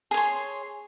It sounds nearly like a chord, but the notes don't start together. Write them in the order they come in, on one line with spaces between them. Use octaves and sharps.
G#4 C#5 C6